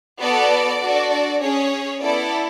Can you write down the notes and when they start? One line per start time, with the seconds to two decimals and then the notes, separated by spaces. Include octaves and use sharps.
0.20 B3 F#4 A4 D5
0.82 D4 F#4 A4
1.12 D5
1.42 C#4 G#4 C#5
2.02 B3 E4 A4 D5